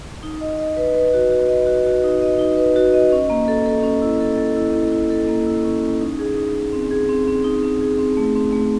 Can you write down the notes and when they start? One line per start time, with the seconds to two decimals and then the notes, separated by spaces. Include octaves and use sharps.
0.23 D#4
0.41 D#5
0.59 D#5
0.77 B4
0.95 B4
1.14 F#4
1.31 F#4
1.49 D#5
1.67 F#4
1.86 F#4
2.04 D#4
2.22 D#5
2.39 D#4
2.57 B4
2.76 F#4
2.94 D#5
3.12 C#4
3.30 A#3
3.48 A4
3.66 A4
3.83 C#4
4.02 E4
4.20 A4
4.38 A4
4.56 E4
4.74 E4
4.92 E4
5.10 A4
5.28 A#3
5.47 E4
5.64 C#4
5.83 C#4
6.00 D#4
6.19 G#4
6.36 D#4
6.55 D#4
6.73 C4
6.91 G#4
7.09 C4
7.28 C4
7.44 D#4
7.63 C4
7.81 G#4
7.99 C4
8.17 A3
8.36 C4
8.53 A3